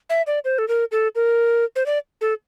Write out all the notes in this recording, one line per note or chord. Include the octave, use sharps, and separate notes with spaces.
E5
D5
C5
A4
A#4
A4
A#4
C5
D5
A4